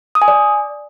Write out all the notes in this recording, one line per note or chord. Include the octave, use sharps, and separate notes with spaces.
D#6
G#5
D5